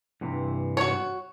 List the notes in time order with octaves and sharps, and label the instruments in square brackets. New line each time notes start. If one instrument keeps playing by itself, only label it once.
[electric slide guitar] G2 C3 E3
[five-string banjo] F#4 C#5